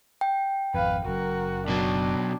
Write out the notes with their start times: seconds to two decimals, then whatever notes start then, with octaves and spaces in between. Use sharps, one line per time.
0.21 G5
0.74 G#1 F2 B4 F5
1.05 F#1 F#2 F#4 A#4
1.68 B2 F#3 D4